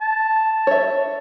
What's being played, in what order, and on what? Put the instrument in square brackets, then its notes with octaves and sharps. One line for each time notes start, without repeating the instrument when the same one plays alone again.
[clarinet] A5
[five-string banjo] C#5 E5